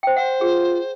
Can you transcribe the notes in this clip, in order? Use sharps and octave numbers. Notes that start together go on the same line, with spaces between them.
C5 G5
C5 F#5
F4 G#4